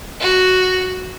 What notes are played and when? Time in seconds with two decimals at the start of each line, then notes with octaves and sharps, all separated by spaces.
0.21 F#4